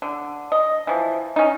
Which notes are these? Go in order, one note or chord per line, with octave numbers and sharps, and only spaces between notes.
D3
D#5
E3 F3
C#4 D#4